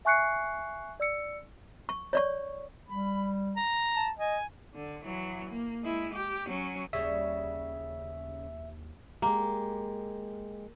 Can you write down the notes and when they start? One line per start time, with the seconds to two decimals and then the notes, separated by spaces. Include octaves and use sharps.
0.05 E5 G#5 C#6 F#6 C7 C#7
1.00 D5 E6 C#7
1.89 C#6
2.13 C#5 D5 C#6
2.87 G3 B5
3.56 A#5
3.96 A5
4.19 D#5 G#5
4.75 D3
5.04 E3 F#3
5.50 A#3
5.82 G#3 E4
6.14 G4
6.47 F#3 C#4
6.93 D#2 C#3 G3 E5
9.22 G#3 A#3 G4